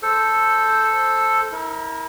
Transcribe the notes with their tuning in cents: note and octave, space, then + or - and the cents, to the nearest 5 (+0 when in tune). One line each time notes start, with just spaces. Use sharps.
A4 +0 C5 +0
E4 -35 A#4 +0